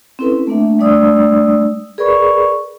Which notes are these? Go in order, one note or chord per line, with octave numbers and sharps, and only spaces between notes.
C4 C#4 E4 A4 B4
A3 A#3 D4 E5
G3 A3 D4 D5 D#6 E6
G#4 A#4 B4 D5 B5 C#6